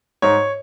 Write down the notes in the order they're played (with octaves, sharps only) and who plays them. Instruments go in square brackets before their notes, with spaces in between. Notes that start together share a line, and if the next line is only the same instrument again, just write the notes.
[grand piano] G#2 C#5